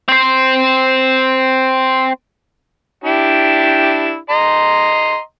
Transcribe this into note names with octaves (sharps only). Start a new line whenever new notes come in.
C4 C5
D4 E4 G4
D#5 A#5 C6